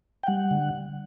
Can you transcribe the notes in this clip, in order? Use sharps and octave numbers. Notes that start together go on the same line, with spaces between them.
G5
G3 F#5
D3